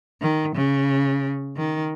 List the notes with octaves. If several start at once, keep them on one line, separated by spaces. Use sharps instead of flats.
D#3
C#3
D#3